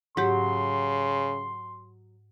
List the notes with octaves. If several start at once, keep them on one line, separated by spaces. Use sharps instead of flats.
G#2 C#3 F#3 G4 C6